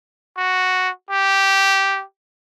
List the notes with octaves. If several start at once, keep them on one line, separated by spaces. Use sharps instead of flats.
F#4
G4